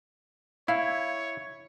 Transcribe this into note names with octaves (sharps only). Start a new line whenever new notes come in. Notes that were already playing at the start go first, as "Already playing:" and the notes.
E4 C#5 F5